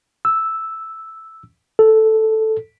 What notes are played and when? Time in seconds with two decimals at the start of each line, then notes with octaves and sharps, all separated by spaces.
0.25 E6
1.79 A4